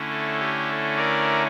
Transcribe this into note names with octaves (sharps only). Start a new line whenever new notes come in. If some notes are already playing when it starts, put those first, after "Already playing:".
Already playing: D3 A3 C#4 E4
A4
G4
A4
A#4 D5